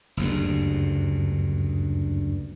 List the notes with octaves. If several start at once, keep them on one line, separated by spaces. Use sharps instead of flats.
F#1 D2 G2